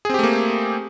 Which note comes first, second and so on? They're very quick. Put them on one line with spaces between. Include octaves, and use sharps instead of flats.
G#4 C4 G4 A3 A#3